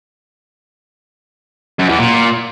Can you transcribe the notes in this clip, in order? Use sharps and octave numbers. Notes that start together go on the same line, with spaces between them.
F#2
E2
A#2